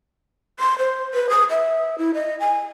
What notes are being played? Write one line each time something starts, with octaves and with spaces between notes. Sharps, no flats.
C6
C5
B4
D#6
E5
E4
D#5
G#5